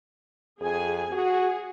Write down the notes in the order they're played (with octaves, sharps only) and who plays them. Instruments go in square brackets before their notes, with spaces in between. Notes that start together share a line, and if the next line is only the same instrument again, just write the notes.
[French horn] F2 [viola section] G#4 G#5
[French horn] F#4 [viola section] G#4